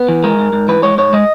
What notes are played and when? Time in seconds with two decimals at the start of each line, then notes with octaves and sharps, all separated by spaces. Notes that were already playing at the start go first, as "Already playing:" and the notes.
Already playing: B3
0.08 E3
0.24 G#3 A#4
0.39 G#2
0.53 G#2
0.68 E3 B4
0.83 G#3 C#5
0.98 G#2 C#5
1.13 G#3 D#5